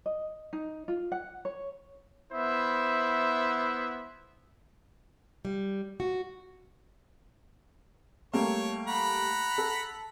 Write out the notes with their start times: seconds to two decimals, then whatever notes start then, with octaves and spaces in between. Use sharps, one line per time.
0.06 D#5
0.53 D#4
0.88 F4
1.12 F#5
1.45 C#5
2.32 B3 E4 C5 E5
5.45 G3
6.00 F#4
8.34 G3 A3 A#3 C#5
8.88 F#5 A#5 B5
9.58 A4